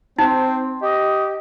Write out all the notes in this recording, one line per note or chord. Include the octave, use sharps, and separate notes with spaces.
C4 D#4 C5
G4 D#5